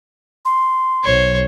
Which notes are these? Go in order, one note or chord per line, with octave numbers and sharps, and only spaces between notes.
C6
B1 C5 C#5